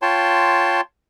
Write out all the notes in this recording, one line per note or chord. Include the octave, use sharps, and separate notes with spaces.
F4 C#5 G5 A5 C6